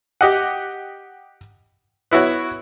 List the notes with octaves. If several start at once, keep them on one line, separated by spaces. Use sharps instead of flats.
G4 D#5 F#5
B3 E4 F#4 C#5